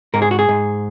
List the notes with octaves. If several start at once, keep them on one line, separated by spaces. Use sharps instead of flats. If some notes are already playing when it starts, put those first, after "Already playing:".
G#2 A#4
G#4
F#4
G#4
G#2